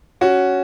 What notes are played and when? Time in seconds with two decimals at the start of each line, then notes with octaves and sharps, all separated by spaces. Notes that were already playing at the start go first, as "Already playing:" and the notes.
0.21 C#4 F#4